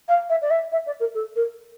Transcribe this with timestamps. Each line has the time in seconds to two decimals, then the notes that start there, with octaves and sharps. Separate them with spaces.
0.08 F5
0.29 E5
0.42 D5
0.50 E5
0.72 E5
0.86 D5
1.00 A#4
1.14 A4
1.36 A#4